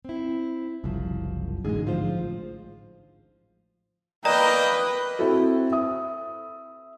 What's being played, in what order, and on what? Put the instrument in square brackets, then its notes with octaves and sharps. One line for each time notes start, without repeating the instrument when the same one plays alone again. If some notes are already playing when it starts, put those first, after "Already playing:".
[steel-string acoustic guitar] C4 E4
[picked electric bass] F#1 C2 [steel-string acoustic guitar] F#2 F3
[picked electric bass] A1 D2 G#2 [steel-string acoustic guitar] G#3 G#4
[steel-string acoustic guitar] F3 F4 C5
[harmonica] A#3 G5 [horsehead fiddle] B4 [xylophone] D5 A#5 [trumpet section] D#5
[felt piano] C4 E4 F#4 A4
E5 D#6